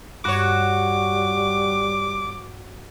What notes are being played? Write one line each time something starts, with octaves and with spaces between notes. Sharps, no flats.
G2 G3 F#4 C#5 D6